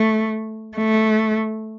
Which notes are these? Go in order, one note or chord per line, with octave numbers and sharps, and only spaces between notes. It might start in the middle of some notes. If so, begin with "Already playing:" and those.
Already playing: A3
A3